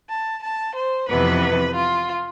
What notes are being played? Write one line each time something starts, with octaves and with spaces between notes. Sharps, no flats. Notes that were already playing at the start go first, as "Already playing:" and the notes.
A5
A5
C5
F2 C3 E3 B3 B4
F4